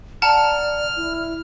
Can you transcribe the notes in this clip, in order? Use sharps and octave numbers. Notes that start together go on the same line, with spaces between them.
D5 F#5 A5 A#5 F6
E4